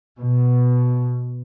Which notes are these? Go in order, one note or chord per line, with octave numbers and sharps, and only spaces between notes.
B2